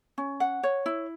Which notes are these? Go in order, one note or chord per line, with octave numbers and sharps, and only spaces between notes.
C#4
F#5
C#5
E4